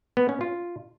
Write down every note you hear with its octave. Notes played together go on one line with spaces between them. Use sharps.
B3
C#4
F4